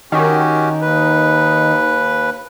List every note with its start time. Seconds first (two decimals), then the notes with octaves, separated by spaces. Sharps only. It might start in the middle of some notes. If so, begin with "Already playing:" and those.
0.12 D#3 C#4 F#4 G4
0.81 D#2 B4